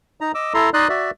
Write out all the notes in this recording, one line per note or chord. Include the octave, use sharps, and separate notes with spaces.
D#4 A#5
D#5 D6 E6
E4 A4 A#5 C6
D#4 D5 D#5 C6 D#6 F#6
F#4 D5 E5